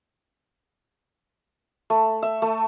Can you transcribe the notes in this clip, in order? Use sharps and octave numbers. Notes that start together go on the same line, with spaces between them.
A3
E5
A3